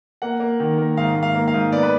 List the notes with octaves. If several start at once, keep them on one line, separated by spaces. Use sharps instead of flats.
A#3 F#5
A#3
D#3
A#3
G#2 F5
G#2
F5
A#3
F5
G#2
B3 D5
B4